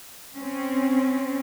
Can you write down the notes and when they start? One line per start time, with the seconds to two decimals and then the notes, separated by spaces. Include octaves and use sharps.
0.35 C4 C#4